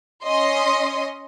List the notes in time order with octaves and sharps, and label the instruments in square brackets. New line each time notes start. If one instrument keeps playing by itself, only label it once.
[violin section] C#4 D#5 C6